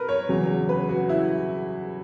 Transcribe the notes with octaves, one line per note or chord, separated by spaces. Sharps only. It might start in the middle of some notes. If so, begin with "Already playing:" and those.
Already playing: A#4 B4
C#5
E2 C#3 F#3
B4
F#4
E4